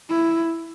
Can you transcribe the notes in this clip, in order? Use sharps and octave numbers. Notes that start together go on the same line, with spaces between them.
E4